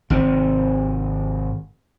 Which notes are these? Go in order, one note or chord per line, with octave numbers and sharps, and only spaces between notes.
G#1 C3 C4